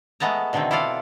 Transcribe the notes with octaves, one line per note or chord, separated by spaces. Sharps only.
G#3 A3 B3 A5 A#5
B2 D3 D#3 A3 C4
E4 F4 A4 D5 F5 F#5